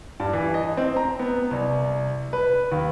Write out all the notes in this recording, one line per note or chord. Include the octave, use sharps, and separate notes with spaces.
G2
E3
D#5
C4
A#5
B3
C2
B4
D#2